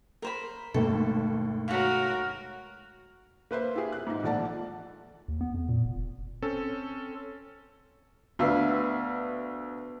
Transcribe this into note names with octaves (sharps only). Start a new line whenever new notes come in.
A#4 C5 B5
G1 D#2 B2 G#3 A3 A4
F#4 A#4 C#5 F5
A#3 B4 C5 E5
E4 F4 G4 G#4
F#6
G#2 D#4
A#1 F3 A3 D5 F#5 A5
D#2
B3
F2
A#2
F1
C4 C#4 A4
D2 B3 B4 E5 F5